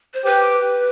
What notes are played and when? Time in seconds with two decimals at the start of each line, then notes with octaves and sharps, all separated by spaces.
0.14 C5
0.25 G4 B4